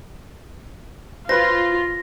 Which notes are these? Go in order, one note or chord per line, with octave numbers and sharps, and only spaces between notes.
F4 B4 C5 A#6